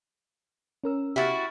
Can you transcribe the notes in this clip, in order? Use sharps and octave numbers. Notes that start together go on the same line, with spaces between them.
C#4 A#4 E6
E4 F#4 G4 F6 A6